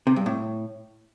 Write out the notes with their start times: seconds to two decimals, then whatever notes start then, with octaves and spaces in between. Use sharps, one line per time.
0.07 C3
0.16 G2
0.26 A2